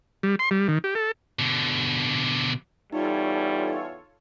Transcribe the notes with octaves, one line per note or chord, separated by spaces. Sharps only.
G3
C6
G3
D#3
G4
A4
B2 D3
E2 G3 D#4 F4 A4 C#5